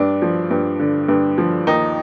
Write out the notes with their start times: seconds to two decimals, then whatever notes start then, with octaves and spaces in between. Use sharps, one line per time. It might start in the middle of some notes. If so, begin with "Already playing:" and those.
Already playing: G2 D4
0.22 F3
0.51 G2
0.80 D3
1.09 G2
1.38 F3
1.67 D#2 D#4